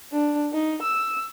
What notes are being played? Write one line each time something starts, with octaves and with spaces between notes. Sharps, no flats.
D4
D#4
E6